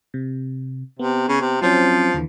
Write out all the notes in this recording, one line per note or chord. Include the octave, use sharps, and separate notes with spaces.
C3
C3 B3
C#3
C3
F3 F#3 C4 C#4
D#2 D3 E3